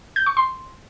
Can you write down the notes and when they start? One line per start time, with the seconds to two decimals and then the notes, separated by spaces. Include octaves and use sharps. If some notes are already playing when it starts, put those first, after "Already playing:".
0.16 G6
0.26 C#6
0.37 C6